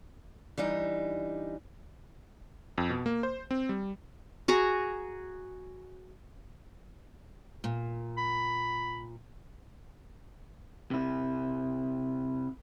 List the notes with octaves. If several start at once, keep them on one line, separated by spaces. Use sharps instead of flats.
E3 G3 D4 D#4
F2
B2
A#3
C5
C4
G3
F#4 G#4 A#5
A#2
B5
C3 E4